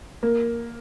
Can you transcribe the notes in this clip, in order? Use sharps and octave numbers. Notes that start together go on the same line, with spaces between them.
A#3